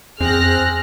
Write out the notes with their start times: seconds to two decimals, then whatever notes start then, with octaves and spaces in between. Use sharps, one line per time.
0.20 F2 C4 G#4 F6 F#6 A#6